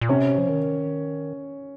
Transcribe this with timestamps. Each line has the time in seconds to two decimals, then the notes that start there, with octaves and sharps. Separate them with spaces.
0.01 A#2
0.09 C3 C#4
0.38 F3
0.49 D#3